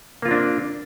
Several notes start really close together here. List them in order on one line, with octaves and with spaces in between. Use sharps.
A#3 F4 C4 D4